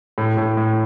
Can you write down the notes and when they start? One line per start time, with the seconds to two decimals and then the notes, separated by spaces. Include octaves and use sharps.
0.18 A2
0.37 A2
0.57 A2